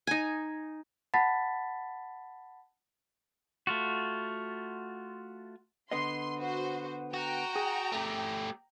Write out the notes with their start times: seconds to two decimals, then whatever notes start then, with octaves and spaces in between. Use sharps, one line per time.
0.07 D#4 G#5
1.14 F#5 A5 B5 A6 B6
3.67 A3 F4 F#4
5.91 D3 B3 D#5 C6
6.38 F#4 C5
7.14 F#4 G5 A#5
7.56 G#4
7.92 A3 G4